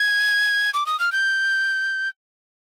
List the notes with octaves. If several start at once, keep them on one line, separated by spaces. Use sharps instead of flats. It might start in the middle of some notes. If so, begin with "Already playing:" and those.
Already playing: G#6
D6
D#6
F6
G6